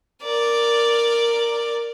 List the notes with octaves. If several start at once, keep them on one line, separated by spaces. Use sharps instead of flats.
A#4 D5